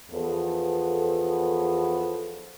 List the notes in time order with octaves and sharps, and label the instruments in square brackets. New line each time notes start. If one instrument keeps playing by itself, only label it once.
[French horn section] E2 F3 B3 A4